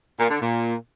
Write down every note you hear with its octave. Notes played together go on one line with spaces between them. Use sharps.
A#2
D3
A#2